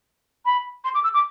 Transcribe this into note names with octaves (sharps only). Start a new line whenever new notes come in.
B5
C6
D6
E6
D6